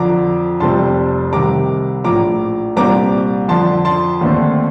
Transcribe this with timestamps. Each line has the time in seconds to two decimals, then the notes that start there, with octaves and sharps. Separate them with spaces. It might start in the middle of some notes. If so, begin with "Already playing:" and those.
Already playing: F2 D3 F3 A#5 D6
0.60 F1 F2 C3 G3 C4 A5 C6
1.33 C2 C3 D#3 A#5 D6
2.04 A#1 A2 F3 A#5 D6
2.76 C2 A#2 G3 C4 A#5 D6
3.48 F2 D3 F3 A5 C6
3.85 A5 C6
4.21 D#2 D3 A3 C4